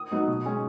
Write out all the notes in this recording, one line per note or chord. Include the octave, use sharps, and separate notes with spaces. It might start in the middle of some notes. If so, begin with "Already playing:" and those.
Already playing: D#6
F#3 B3 D#4
B2
G#3 C#4